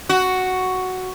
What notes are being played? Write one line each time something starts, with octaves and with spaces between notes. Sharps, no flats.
F#4